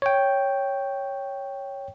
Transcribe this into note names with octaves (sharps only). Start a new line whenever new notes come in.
C#5 G5